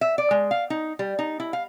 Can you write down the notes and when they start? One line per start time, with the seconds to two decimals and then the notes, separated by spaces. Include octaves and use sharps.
0.01 E5
0.18 D5
0.31 G#3
0.51 F5
0.70 D#4
0.99 G3
1.19 D#4
1.40 E4
1.53 F5